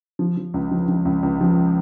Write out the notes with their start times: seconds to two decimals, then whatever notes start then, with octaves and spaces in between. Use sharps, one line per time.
0.19 F3
0.37 F3
0.54 C#2
0.71 F3
0.88 F3
1.05 C#2
1.23 C#2
1.41 F3